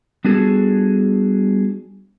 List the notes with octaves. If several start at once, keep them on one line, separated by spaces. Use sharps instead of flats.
G3 B3 D4 F#4 G#4 A4